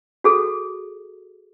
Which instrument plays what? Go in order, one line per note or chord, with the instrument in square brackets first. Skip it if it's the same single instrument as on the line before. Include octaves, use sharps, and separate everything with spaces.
[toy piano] F#4 G#4 A4